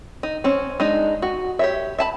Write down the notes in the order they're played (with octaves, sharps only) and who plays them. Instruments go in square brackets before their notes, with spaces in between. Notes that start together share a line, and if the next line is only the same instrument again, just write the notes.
[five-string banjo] D#4
C4 C#4
G#3 D4 D#4
F#4
G4 C#5 E5
E5 A5 B5